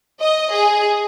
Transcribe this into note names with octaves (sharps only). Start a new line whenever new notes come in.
D#5
G#4